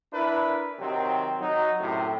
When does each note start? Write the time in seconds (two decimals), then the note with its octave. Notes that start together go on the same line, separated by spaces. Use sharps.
0.13 D4 E4 A#4 B4
0.79 C3 D#3 F#3 C4
1.40 F#3 D#4
1.80 F#2 A2 C3 F#3